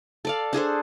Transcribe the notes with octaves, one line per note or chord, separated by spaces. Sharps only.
A4 D5 F5
D4 G#4 A4 C5